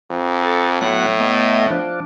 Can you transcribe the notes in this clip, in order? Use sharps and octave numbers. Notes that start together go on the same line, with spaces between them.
F2
A4
A2 F#3 B3 F#5
A3 B3 D#5
F3 D4